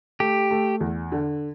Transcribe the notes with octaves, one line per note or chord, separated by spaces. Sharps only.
A3 G4
A3
E2
D3